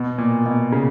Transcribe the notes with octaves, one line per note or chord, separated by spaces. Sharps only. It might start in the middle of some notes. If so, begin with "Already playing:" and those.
Already playing: B2
A#2
B2
C#3